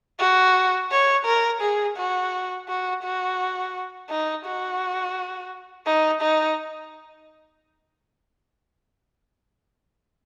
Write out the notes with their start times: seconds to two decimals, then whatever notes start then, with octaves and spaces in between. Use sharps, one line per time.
0.19 F#4
0.91 C#5
1.26 A#4
1.61 G#4
1.98 F#4
2.69 F#4
3.03 F#4
4.10 D#4
4.46 F#4
5.86 D#4
6.22 D#4